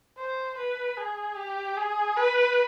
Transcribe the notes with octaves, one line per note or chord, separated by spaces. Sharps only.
C5
B4
G#4
G4
G#4
B4